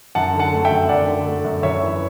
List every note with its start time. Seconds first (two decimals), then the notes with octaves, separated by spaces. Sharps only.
0.15 F#2 F#5 A5
0.34 D3
0.39 F#5 A5
0.53 A3
0.65 E5 G5
0.70 F#2
0.89 F#2 D5 F#5
1.08 D3
1.27 A3
1.45 F#2
1.63 F#2 C#5 E5
1.82 E3